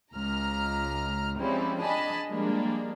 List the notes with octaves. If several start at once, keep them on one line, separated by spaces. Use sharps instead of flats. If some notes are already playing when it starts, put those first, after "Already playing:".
C#2 A#5 F6
F3 G3 G#3 C4 C#4 E4
D4 G#4 D#5 G#5 A5 B5
F3 G3 G#3 A#3 D4